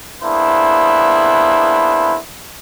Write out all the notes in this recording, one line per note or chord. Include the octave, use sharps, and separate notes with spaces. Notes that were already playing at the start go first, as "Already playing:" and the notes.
A#3 B3 D4 E4 G#4 C5